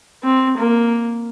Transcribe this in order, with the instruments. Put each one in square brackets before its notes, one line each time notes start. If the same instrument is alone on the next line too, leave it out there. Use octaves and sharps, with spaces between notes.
[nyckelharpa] C4
A#3